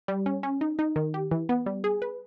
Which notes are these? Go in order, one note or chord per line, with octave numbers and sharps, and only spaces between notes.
G3
C#4
C#4
D#4
D#4
D#3
G4
E3
B3
G3
G#4
B4